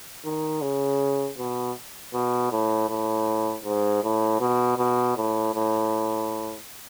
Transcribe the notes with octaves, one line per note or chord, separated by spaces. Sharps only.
D#3
C#3
B2
B2
A2
A2
G#2
A2
B2
B2
A2
A2